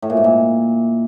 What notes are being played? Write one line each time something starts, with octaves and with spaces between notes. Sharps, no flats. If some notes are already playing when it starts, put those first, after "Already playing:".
A2
A#2
G#2
A#2